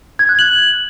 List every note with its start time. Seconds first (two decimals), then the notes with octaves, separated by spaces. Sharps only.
0.19 G#6
0.29 F#6
0.39 F#7